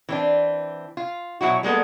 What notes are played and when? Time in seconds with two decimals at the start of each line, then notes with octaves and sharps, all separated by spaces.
0.09 E3 C4 D4
0.97 F4
1.41 B2 F#3 E4 F#4
1.63 G3 G#3 A#3 B3 A4